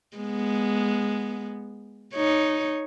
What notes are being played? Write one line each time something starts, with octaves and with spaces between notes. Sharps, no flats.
G#3 B3
D#4 C#5